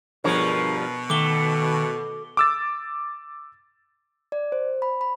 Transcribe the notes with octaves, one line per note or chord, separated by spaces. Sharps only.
G2 B2 F3 G#4 A#4 C#5
D#3 A3 D6 G7
D6 E6 A6
D5
C5
B5
B5